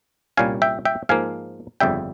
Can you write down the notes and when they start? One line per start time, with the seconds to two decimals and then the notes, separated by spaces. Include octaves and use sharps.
0.37 C2 A#2 G3 C#4 F5 G#5
0.62 E5 G5
0.85 E5 G5
1.09 G#2 F3 A#3 F5 G#5
1.80 G1 F2 C#3 G3 E5 G5